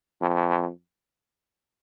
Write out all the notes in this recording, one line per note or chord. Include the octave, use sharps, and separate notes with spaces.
F2